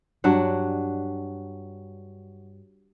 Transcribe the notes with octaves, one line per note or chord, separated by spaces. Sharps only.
G2 F#3 D4 F#5